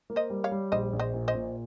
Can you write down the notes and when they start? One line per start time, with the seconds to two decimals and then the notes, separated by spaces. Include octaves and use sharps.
0.10 A#3
0.16 C5 D#5
0.30 G3
0.44 C#5 F5
0.51 G3
0.72 A#1 C5 D#5
0.93 A#1
1.00 C5 D#5
1.14 A#2
1.28 C5 D#5
1.35 A#2